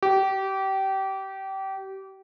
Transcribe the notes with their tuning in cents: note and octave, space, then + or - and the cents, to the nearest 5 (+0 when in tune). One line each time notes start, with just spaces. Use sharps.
G4 -25